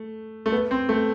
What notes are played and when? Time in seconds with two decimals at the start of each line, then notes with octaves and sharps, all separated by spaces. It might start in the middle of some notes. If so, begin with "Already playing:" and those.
Already playing: A3
0.46 A3
0.52 B3
0.71 C4
0.89 A3